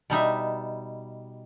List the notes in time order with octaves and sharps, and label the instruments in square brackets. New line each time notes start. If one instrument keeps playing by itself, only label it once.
[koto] B2 G3 D#4 E5